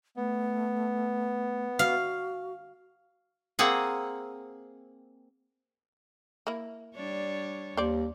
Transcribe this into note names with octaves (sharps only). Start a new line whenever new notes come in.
A3 B3
F#4 F5
A#3 C4 G#4 F#5
A#3 E4
G3 D4 C#5
D#2 C5 D5